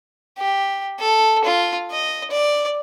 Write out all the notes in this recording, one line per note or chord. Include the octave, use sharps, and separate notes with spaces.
G4
A4
F4
D#5
D5